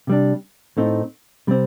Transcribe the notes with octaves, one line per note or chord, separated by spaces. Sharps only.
C3 G3 D4
A2 A3 C4 D#4
C3 G3 C4